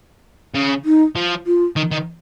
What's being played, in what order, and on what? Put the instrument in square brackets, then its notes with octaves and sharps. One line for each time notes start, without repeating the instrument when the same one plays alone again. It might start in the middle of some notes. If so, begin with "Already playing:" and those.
[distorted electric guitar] C#3
[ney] D#4
[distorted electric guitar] F3
[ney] F4
[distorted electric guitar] D#3
D#3